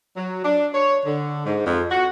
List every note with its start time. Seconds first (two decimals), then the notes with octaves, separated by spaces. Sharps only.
0.17 F#3
0.44 D4
0.74 C#5
1.05 D3
1.45 G#2
1.65 F2
1.90 F#4